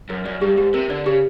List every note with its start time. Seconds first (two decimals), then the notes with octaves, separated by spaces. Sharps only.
0.09 F#2 A#4
0.25 F#2 D5
0.41 G2 G4
0.57 G#2 G4
0.74 C3 A#4
0.90 D3 D5
1.06 C#3 G4